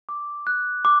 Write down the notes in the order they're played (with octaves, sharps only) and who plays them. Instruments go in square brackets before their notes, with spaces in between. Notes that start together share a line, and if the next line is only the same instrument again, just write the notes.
[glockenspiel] D6
F#6
D6